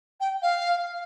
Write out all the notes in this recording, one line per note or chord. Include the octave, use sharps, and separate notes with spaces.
G5
F5